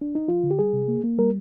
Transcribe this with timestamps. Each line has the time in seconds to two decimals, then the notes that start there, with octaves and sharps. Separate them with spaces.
0.01 D4
0.15 D#4
0.28 F3 F4
0.43 D3
0.51 G4
0.59 G3 G#4
0.73 C3
0.88 A#3
1.04 A#3
1.19 G3 A#4